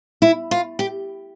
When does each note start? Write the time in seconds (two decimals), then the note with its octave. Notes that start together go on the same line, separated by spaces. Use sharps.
0.22 E4
0.51 F4
0.79 G4